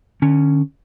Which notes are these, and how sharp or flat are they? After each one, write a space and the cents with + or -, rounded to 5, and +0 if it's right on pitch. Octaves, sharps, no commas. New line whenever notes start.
D3 +35 C#4 +0